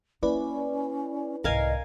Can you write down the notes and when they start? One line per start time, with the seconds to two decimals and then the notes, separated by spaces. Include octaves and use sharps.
0.23 A#3 C#4 E4 B4 D5
1.44 C2 G#2 A#4 D#5 F5 G#5